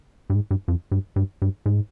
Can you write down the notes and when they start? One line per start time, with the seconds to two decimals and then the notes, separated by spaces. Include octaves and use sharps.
0.30 G2
0.35 G#2
0.51 G2
0.68 F2
0.92 G2
1.16 G2
1.42 G2
1.66 G#2